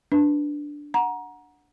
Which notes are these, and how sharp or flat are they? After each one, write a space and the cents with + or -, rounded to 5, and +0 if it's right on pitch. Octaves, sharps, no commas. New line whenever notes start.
D4 +0 B4 +0
F#5 -10 A#5 +20